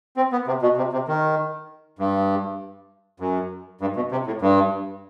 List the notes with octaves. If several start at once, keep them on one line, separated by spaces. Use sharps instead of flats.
C4
B3
C3
B2
C3
C3
D#3
G2
F#2
G2
B2
C3
A2
G2